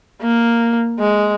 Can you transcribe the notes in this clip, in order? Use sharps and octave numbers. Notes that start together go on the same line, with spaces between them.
A#3
G#3